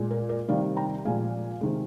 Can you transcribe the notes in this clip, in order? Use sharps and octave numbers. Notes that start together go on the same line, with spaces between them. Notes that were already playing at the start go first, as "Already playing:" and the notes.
Already playing: A#2 G#3
A#4
A#4 D5
C3 D#3 G3 D5 F5
G5 A#5
A#2 F3 G#3 F5 G#5
C3 D#3 G#3